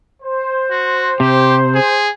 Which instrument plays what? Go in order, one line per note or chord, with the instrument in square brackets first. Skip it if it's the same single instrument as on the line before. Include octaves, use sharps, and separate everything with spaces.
[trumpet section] C5
[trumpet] F#4
[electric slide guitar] C3 [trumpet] G4
[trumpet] G#4